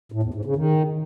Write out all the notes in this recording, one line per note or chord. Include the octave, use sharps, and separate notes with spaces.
A2
E2
G#2
C#3
D#3